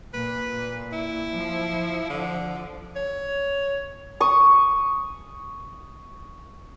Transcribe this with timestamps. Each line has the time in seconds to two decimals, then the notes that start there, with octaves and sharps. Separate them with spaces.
0.14 A#2 B4
0.92 E4
1.33 F3
2.10 D3
2.96 C#5
4.20 C#6 D#6